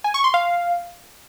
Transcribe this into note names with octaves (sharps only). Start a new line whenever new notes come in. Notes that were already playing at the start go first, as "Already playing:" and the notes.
G#5
C#6
C6
F5